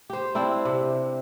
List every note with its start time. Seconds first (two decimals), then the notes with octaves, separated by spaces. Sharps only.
0.10 G4 C5
0.35 C4 D4 E4
0.65 C3